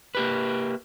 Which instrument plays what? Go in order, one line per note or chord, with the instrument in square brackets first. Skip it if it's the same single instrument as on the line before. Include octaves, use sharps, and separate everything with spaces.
[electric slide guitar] A#3 G4 B4